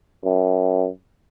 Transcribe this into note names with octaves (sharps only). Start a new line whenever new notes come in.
F#2